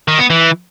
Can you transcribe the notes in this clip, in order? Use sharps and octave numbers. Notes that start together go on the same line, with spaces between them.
D#3
B3
E3